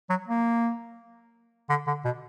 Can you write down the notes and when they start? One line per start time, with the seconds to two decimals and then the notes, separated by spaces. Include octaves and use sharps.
0.10 F#3
0.28 A#3
1.70 D3
1.87 D3
2.05 B2